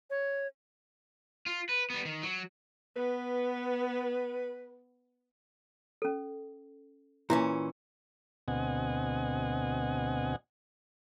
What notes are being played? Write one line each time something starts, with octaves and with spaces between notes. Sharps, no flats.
C#5
F4
B4
G3 B3
D#3
F#3
B3 B4
C#4 A4
A#2 E3 C#4 E4
D2 B2 C4 D#5 F#5 G#5